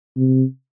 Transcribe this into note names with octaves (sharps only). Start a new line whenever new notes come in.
C3